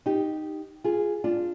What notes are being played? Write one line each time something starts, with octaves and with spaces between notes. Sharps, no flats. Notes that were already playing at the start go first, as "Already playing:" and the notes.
D#4 G4
F4 G#4
D4 F4